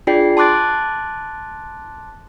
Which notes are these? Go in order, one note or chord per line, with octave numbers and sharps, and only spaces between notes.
D4 F4 G#4 D5 G5 C7
A5 C6 D6 F#6 A6 D7